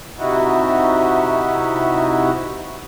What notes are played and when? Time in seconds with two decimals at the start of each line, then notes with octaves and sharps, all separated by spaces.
0.18 C3 D#4 E4 F#4